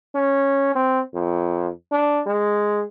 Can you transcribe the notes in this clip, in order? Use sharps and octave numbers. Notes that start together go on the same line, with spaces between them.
C#4
C4
F2
D4
G#3